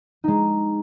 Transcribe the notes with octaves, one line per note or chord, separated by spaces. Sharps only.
G#3 D#4